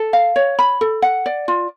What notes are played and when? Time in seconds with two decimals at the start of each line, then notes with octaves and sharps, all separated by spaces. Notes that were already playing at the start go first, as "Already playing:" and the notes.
Already playing: A4
0.13 F5
0.36 C#5
0.59 B5
0.81 A4
1.02 F#5
1.26 D5
1.48 F4